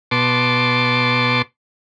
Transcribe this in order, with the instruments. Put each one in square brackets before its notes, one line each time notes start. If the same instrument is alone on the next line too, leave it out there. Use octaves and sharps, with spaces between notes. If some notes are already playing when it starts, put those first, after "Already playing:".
[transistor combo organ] B2 A5 C6 D6